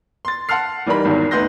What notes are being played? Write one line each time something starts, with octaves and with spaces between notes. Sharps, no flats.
C6 A6
F#5 A5 C6 F6 C7
E3 G3 D#4 A#4 B5
G#1 E2 D#3 F#3
D2 B3 D#4 C6 G6 A#6